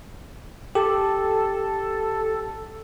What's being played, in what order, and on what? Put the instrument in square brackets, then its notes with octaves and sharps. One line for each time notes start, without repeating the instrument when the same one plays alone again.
[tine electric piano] G4 [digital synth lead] A4